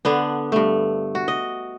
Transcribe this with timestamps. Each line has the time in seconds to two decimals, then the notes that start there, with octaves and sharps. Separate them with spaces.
0.05 D3 B3 D4
0.52 G2 A3
1.15 F#4
1.28 D#5